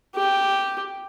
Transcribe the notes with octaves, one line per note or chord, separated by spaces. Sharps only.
G4